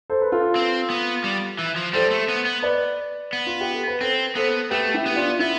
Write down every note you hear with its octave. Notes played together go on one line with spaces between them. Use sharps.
A4 C5
B4
F4 A4
C4
B3
G3
E3
F3
G3 A4 C5
A3
B3
B3
B4 D5
B3
F4
G4
A4
B4
C4 A4 C5
B3 A4 C5
A3 G4 B4
E4 G4
B3
D4 F4
B3 E4